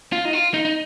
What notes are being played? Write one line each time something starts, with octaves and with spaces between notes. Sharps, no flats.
F4
D#4
F4
D#4
D#4